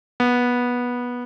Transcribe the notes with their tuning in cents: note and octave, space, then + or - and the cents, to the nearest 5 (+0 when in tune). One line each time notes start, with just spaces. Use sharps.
B3 -15